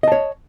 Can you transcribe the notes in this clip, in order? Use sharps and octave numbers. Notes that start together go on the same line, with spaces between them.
C#5 D#5 A5